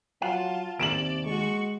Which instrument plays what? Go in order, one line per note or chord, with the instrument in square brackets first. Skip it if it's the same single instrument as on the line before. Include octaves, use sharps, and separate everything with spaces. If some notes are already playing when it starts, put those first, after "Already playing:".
[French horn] F#3 [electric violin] F4 A5 [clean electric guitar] F5 F#5
[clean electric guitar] D#2 [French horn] C3 [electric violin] D5 [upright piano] D7 E7 F#7
[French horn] G#3 [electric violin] F#4 C#6